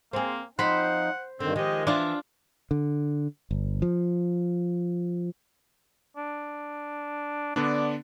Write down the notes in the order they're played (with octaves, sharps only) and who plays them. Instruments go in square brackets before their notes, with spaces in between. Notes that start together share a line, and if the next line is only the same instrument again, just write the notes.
[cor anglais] A#3 [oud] C4 G#4
[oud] F3 C4 [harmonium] D#4 [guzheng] C5 B5 [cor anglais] F#5
[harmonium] G2 D#3 [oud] D3 [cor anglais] C4
[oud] D#3 F3 [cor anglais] G#3 [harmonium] G4 D#5
[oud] E3 [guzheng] D4 F4 [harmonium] E5
[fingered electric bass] D3
G1
F3
[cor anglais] D4
[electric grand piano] D3 B3 D4 [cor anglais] D5